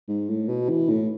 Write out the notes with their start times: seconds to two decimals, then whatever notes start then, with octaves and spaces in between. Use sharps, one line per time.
0.08 G#2
0.30 A2
0.49 B2
0.69 E3
0.90 A2